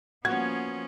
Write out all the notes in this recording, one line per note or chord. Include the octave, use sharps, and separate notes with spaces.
F3 A#3 B3 C#4 F#4 G#6